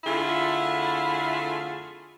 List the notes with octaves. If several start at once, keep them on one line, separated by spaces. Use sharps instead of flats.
F2 D3 A3 E4 F4 G#4